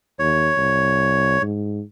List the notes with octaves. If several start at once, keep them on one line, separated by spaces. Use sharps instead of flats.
D#2 C#5
C2
G#2